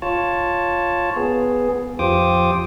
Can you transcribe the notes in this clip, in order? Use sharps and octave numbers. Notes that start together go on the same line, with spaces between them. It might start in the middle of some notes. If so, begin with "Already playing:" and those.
F4 C#5 A5
B3 G#4
F2 F4 G4 C5 D6 D#6